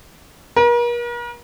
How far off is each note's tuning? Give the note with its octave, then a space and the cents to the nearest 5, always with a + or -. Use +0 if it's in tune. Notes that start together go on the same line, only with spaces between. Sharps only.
A#4 +45